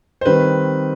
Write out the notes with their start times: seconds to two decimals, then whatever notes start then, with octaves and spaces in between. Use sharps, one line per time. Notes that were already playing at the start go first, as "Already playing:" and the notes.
0.21 C5
0.25 D#3 G3 C4 B4